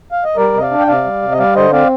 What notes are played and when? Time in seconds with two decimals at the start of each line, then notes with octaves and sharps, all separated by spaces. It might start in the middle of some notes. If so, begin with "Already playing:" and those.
0.12 F5
0.24 D#5
0.37 G3 A#4 D5
0.54 C3 D#5
0.62 D5 F5
0.71 D4
0.79 G5
0.87 C3 D5 F5
1.05 G3
1.22 C3
1.32 D#5
1.39 G3 D5 F5
1.55 D3 C5 D#5
1.72 C4 D5 F5